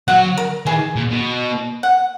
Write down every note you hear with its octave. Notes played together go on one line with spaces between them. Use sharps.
F#3 F#5
A#4
E3 G#4
A#2
B2
F#5